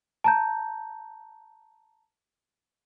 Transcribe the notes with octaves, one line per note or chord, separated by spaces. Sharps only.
A5 A#5 G6